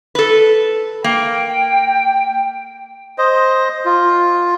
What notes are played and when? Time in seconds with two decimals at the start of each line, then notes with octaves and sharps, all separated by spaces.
0.15 A4 B4
1.04 A#3 G5
3.18 C5 D#5
3.85 F4